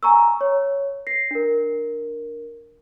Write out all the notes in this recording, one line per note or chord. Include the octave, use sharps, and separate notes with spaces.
G#5 A#5 C#6 E6
C#5
A#6 C7
D4 A#4